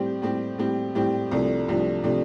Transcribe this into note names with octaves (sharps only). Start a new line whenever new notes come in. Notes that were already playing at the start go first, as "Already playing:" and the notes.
Already playing: A2 G3 C4 G4
A2 G3 C4 G4
A2 G3 C4 G4
A2 G3 C4 G4
C2 C3 F3 A3 D4
C2 C3 F3 A3 D4
C3 F3 A3 D4